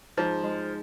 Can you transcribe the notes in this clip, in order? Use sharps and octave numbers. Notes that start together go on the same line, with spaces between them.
G#2 F3
G#3